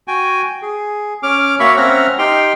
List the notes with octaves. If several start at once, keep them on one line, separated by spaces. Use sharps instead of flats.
F#4 G5 G#5
G#4
C#4 D6 F6
A#3 F#4 C#5 E5 B5 C#6
C4 C#4 E5 F#5 A#5 F6
D#4 G4 G5 C6 F6